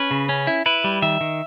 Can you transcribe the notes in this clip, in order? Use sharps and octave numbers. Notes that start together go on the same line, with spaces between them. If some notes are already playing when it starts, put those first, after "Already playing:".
Already playing: C#4 B4
C#3
C#4
E4
E4 B4
G3
D#3 E5
D#3